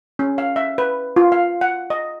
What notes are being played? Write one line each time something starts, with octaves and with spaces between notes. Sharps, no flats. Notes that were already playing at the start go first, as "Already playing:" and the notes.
C#4
F5
E5
B4
F4
F5
F#5
D#5